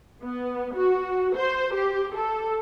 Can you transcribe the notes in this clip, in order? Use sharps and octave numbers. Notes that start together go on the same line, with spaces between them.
B3
F#4
C5
G4
A4